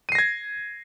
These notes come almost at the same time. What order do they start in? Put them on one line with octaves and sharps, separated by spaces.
D#7 C7 A#6 G#6